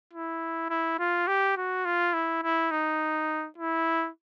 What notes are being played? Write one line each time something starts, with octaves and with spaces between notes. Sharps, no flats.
E4
E4
F4
G4
F#4
F4
E4
E4
D#4
E4